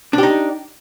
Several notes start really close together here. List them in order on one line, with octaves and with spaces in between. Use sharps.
D4 G4 D#4